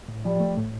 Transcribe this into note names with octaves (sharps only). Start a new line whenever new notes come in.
A2
F3 G3
A3
A2